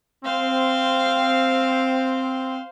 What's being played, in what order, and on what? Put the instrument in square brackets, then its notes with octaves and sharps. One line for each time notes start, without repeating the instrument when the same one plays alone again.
[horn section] C4 [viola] C5 F5